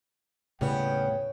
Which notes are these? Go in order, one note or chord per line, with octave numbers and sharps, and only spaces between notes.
D#2 A2 C#3 G3 B3 C#4 G5